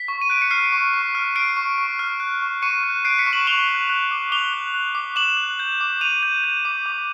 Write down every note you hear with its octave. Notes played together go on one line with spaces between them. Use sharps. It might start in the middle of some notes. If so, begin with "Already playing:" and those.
Already playing: B6
C#6
D#7
F#6 D7
C#7
F6 C7
C#6
C#6
F6
F6 C7 D7
C#6
C#6
F6
F#6
C#6
C#6 C#7 D#7
F#6
F#6 C7 D7
B6 C#7
C#6
E7 F#7
C#6 F7 G7
F#6
F#6
D6
D6 F7 G7
F#6
F#6
D6
D6 E7 F#7
F#6
G6
D6
D6 D#7 F7
G6
G6
D6
D6